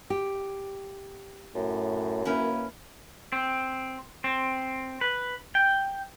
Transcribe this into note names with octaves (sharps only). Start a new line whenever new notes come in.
G4
F#2 A2
A#3 C#4 E4 B4
C4
C4
B4
G5